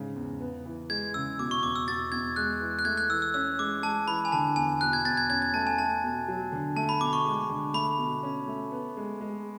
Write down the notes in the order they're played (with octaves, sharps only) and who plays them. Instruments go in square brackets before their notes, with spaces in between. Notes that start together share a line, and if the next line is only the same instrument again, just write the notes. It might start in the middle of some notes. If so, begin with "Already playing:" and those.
Already playing: [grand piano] G#2 C#3
E2
B3
E3
[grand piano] G#3 [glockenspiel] G#6
[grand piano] C#3 [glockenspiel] E6
[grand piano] B2 [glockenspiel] D6
[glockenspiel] C#6
[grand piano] E2 [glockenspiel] D6
[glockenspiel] E6
[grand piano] B2 [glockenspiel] A6
[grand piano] E2 [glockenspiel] G#6
[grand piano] G#3 [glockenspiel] F#6
[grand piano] E3
[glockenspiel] F#6
[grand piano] A3 [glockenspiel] G#6
[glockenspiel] F#6
[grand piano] E3 [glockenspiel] E6
[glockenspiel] E6
[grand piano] C#4 [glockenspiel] E6
[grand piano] G#3 [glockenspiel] D6
[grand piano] G#3 [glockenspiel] A5
[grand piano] E3 [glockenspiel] B5
[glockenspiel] G#5
[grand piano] D3 [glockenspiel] A5
[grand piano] E2 [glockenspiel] G#5
[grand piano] B2 [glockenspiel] F#6
[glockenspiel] G#6
[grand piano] E2 [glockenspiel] A6
[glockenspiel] G#6
[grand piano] C#4 [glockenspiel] G#6
[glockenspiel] G#6
[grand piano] A3 [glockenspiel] A5
[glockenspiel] G#5
[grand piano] A3 [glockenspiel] A5
[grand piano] B2
F#3
D3
[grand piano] A3 [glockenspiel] A5
[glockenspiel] B5
[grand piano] B2 [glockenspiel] D6
[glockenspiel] C#6
[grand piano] G#3
D3
[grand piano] A3 [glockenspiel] B5
[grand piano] B2
C#4
A3
B3
G#3
G#3